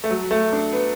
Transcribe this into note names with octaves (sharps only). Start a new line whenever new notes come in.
A3
F#3
A3
D4
B3